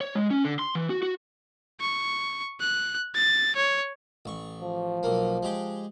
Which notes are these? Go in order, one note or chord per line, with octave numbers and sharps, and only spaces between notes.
C#5
G#3
C#4
D3
C6
E3
F#4
F#4
C#6
F#6
A6
C#5
A1 C#6
F3
B1 A#3
G#3 G4